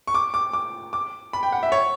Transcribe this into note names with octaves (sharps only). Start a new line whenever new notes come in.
C#6
D6
D6
D6
D6
B5
G5
F#5
E5
C#5